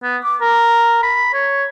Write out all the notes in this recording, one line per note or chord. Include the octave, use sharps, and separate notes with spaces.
B3
D6
A#4
B5
C#5